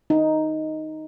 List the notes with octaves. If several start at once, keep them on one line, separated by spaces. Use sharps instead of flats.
D#4